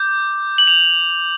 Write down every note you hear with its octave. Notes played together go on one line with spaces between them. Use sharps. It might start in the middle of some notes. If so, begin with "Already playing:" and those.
Already playing: D6 G6
F#7
F7